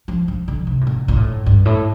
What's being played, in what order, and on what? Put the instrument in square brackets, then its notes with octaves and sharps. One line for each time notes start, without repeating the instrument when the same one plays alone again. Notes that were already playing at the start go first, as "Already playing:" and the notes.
[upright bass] F3
F3
D3
C3
A2
A#2
A#2
A2
G2
A2